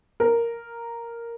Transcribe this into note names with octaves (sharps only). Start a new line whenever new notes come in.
A#4